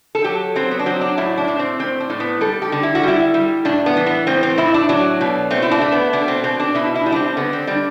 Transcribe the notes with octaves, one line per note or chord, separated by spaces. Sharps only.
A4
F#3 G4
F#3 C4
B3
D4
F#3 C4
D4
A2 E4
D4
A2
C4
A2 C4
D4
A2
B3
G3 A4
G4
D3
E4
F#4
G3 E4
G3
A2 D4
B3
E3
B3
A2 C4
C4
A2 E4
D4
F#3 D4
B2
A3 C4
E4
D4
A3
B3
B2 D4
C4
B2 C4
D4
B2 E4
E4
G3
D4
C4
D3 B3
C4
G3 D4